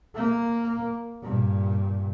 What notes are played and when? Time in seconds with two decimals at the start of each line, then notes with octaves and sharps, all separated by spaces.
0.15 A#3
1.23 G2 A#2